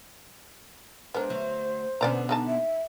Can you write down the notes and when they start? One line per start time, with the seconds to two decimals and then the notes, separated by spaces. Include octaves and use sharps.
1.14 G#3 B3 D4 A#4 C5
1.29 D2 F#3
2.01 B2 D3 B3 C#4 D5 A#5
2.29 G#3 D#4 A5
2.47 E5